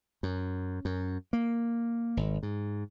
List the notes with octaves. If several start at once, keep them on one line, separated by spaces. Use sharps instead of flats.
F#2
F#2
A#3
G#1
G#2